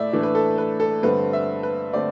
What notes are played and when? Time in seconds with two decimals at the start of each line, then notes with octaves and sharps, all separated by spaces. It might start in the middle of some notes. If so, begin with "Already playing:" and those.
Already playing: A2 A3 D5 E5
0.13 A2 E3 A3 D4
0.23 B4
0.35 A4
0.58 B4
0.80 A4
1.03 G2 D3 A3 C4 B4
1.33 E5
1.63 B4
1.93 D3 A3 C4 D5